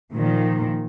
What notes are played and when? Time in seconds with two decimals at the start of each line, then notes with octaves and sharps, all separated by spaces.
0.12 A#2 D#3 F3